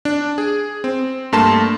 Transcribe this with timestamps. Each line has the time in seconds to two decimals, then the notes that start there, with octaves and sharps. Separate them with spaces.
0.05 D4
0.38 G#4
0.84 C4
1.32 G2 A3 A#3 A5 C6 E7